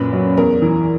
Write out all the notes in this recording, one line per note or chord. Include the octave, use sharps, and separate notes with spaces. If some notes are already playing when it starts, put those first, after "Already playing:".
Already playing: F#2 A#2 B4
F#3
E2 A#4
E3